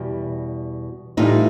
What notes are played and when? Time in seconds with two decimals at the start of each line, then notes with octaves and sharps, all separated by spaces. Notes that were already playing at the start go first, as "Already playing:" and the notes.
Already playing: E2 B2 G3
1.17 A2 E3 G3 D#4 F4